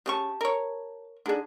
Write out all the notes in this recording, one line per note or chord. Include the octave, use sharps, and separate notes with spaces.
C#3 C#4 G4 A5 C#6
A#4 C#5
D3 D4 D#4 G#4